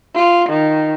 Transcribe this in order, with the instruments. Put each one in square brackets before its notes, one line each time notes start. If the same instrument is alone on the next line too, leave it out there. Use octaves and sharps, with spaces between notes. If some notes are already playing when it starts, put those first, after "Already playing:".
[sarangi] F4
D#3